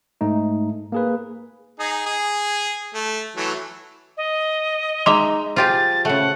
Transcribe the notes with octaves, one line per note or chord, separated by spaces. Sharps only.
G#2 A3 D#4
A#3 G#4 B4
D#4 G#4
G#4
A3
E3 F#3 A3
D#5
G#3 D#4 E5 C6 D6
F3 F4 G4 G#4 A6
C#3 A3 F#5